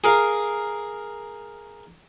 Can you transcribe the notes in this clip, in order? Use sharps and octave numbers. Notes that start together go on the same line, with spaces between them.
G#4 A#4 F5